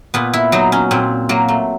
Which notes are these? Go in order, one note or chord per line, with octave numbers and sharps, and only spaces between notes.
A#2 B3
E4
F#3 D#4
C#4
A#2 C4
F#3 A#3
A3